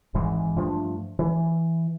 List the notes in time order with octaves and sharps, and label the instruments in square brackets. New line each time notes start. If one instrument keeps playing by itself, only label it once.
[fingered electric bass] G#1 G#2 E3 G#3
G2 F3 A3 D4
E3